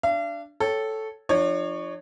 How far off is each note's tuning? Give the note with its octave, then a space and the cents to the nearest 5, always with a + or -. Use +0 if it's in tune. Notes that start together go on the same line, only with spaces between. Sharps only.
D4 +0 F5 -45
A4 -5 C#5 +0 G5 +0
F3 +0 D4 +40 C#5 +0